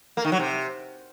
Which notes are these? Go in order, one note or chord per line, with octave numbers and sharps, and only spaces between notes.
A#3
D#3
F#3
C3